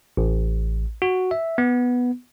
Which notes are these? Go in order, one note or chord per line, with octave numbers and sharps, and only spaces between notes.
A1
F#4
E5
B3